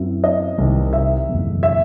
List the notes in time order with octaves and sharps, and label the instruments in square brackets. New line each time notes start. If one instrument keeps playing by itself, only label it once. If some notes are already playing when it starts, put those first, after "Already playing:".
Already playing: [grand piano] F#2 F#3 C4 E4
[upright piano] D#5
[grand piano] C2 C3 D#3
[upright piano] E5
[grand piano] F#1 E2 B2 A3
[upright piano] E5